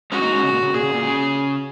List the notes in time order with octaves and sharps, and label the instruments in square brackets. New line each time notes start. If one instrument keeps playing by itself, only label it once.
[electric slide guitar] G#3 C#4 [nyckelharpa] F#4
[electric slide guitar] A#3 D#4
G#3 C#4
C#3
A#2
C#3
[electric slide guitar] A#2 [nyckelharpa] G#4
[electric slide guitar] C#3
A#2
C#3